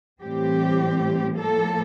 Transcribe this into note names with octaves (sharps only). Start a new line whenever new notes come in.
A2 E3 G3 C4 G4
A2 F3 A#3 A4